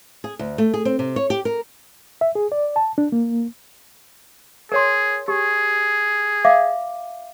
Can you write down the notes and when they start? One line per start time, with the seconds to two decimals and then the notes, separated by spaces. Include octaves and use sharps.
0.24 G#4
0.39 D2
0.58 A3
0.74 G#4
0.85 C4
0.99 C3
1.16 C#5
1.30 G4
1.45 A#4
2.21 E5
2.35 G#4
2.52 D5
2.76 A5
2.98 D4
3.12 A#3
4.72 G#4 A#4 C#5 C6
5.28 G4 G#4
6.45 E5 F5 D6